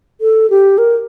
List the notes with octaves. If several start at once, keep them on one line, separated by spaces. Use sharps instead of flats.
A4
G4
A#4